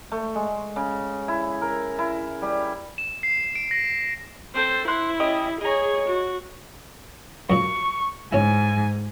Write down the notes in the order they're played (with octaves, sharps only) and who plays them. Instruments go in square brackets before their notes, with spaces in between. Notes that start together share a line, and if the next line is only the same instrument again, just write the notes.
[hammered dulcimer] A3
G#3
C#3
E4
A#4
E4
G3
[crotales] E7
C7
D7
A#6
[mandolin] C4 A4 [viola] C5
[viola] E4 [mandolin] C5 F#6
[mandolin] C#4 G4 D#5
[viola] G#4 C#5 [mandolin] D#5 A#5
[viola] F#4
[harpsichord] F#2 A#2 [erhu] C#6
[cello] G#2 [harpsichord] C#4 E4 [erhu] G#5